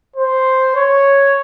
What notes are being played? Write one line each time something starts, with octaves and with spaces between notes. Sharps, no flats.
C5
C#5